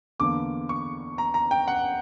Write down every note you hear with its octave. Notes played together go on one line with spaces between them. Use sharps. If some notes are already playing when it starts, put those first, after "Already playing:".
E2 D3 A#3 D6
C#6
A#5
A#5
G5
F#5